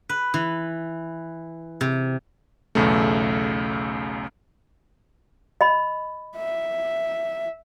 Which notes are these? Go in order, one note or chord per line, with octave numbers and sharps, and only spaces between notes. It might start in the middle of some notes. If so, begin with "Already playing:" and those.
B4
E3
C3
B1 E2 C#3 A3
D#5 B5
E5